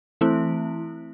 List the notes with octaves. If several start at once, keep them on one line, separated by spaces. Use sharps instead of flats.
E3 A3 C4 E4